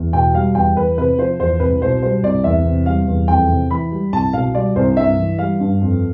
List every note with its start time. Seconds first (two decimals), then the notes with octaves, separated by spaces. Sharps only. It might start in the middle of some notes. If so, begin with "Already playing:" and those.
Already playing: E2
0.13 B2 G5
0.34 G3 F5
0.55 E2 G5
0.76 E2 B4
0.97 C3 B4
1.18 F3 C5
1.40 E2 C5
1.60 C2 B4
1.81 B2 C5
2.02 G3 C5
2.23 C2 D5
2.44 E2 E5
2.66 C3
2.86 G3 F5
3.08 E2
3.28 F2 G5
3.49 C3
3.70 E3 B5
3.92 G3
4.13 C2 A5
4.33 B2 F5
4.54 G3 D5
4.76 C2 C5
4.97 G2 E5
5.18 E3
5.39 G3 F5
5.60 G2
5.81 F2